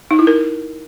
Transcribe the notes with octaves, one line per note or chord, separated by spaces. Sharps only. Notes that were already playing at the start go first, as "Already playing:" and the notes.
D#4
E4
A#4